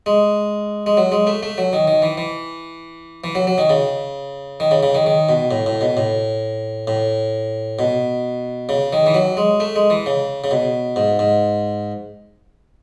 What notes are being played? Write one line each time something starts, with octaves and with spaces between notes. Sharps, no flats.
G#3
G#3
F#3
G#3
A3
A3
F#3
D#3
D#3
E3
E3
E3
F#3
F#3
D#3
C#3
D#3
C#3
C#3
D#3
D#3
B2
A2
A2
B2
A2
A2
B2
C#3
D#3
E3
F#3
G#3
A3
G#3
E3
C#3
C#3
B2
G#2
G#2